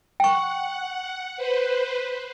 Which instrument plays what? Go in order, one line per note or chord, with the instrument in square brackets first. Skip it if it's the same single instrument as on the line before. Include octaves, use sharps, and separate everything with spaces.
[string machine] F#5 [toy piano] G5 C#6
[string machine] B4 C5